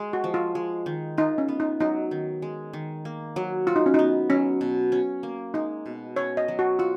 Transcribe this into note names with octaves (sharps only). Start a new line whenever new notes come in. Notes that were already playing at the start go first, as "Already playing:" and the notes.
Already playing: G#3
F#4
F3
F4
G#3
D#3
D#4 F4
C#4
B3
D#4
F#3 D#4
D#3
G#3
D#3
A#3
F#3
F4 F#4
D#4
C#4
B3 D#4
F#3 C#4
B2
C#4
A#3
G#3 D#4
B2
C#4 C#5
D#5
F#3
F#4
F4 F#4